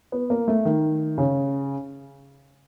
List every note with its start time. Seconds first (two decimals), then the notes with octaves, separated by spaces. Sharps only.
0.12 B3
0.30 A#3
0.48 A3
0.65 D#3
1.18 C#3